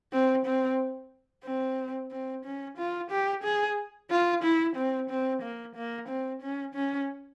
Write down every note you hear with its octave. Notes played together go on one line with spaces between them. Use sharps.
C4
C4
C4
C4
C#4
F4
G4
G#4
F4
E4
C4
C4
A#3
A#3
C4
C#4
C#4